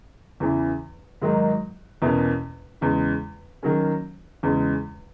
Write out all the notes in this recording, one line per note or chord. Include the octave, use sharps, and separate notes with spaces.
E2 C#3 E3
G#2 D#3 F#3 A#3 D#4
E2 B2 A#3 C#4
E2 C#3 G#3
D#3 F#3 A#3 C#4
E2 C#3 G#3